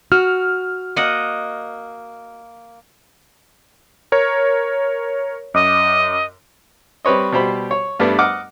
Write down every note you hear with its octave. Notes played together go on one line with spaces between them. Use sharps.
F#4 F6
A#3 D#5 F#5
A#4 C#5
F#2 D#5 D6
G3 C4 B4 C#5 D#5
B2 G3 G4 C5 B5
C#5
G2 G3 A3 B3 D4
D#5 F#5 D6 F6